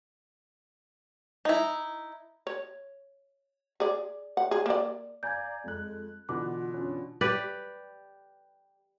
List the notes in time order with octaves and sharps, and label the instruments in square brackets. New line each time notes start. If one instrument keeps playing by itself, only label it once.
[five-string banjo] D#4 E4
[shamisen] C#5
G#4 D5
F#5
G#4
A#3 D5
[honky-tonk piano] D5 G#5 A#5 [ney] F5 [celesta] G6 G#6
[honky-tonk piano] F2 F#6 [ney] G#3
[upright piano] B2 D3 E3 [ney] F4 [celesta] D6 [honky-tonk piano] F#6
[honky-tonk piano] C#4 D4
[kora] G4 B4 D5